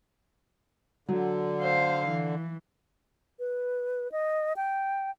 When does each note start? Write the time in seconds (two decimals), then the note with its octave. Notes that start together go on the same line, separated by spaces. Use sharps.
1.09 D3 F#3
1.62 C5 F5
2.08 E3
3.39 B4
4.12 D#5
4.56 G5